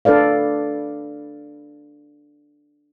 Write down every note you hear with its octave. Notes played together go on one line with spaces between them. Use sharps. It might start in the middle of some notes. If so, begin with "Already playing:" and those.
D4 A4 B4 D5 F5